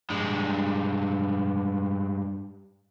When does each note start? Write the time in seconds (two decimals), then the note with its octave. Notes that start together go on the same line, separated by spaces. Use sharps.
0.10 G2 G#3